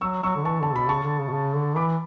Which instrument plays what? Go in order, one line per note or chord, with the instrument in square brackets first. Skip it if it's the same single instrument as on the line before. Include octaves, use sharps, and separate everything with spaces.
[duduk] F#3 [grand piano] C#6 E6
[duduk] F#3 [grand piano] C#6 E6
[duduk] D3
[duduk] E3 [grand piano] A5 C#6
[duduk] D3 [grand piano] A5
[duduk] B2 [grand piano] B5
[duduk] C#3 [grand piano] A5 C#6
[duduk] D3
C#3
B2
C#3
D3
[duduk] E3 [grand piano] B5 D6